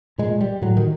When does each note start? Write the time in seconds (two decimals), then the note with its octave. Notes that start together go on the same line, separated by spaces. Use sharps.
0.18 A#2 G#3
0.41 G3
0.62 A2 F#3
0.77 D#3